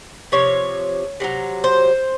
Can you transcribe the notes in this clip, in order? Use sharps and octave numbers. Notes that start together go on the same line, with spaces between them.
C3 F3 C#5
C3 D#3 F#3
C5